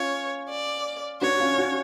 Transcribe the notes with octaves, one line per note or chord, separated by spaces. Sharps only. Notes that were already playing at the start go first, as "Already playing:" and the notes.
Already playing: C#4 F4 C#5
D5
D4 F#4 C#5
C#4 F4
D4 F#4